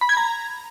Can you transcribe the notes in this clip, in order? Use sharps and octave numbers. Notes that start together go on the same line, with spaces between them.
B5
G#6
A#5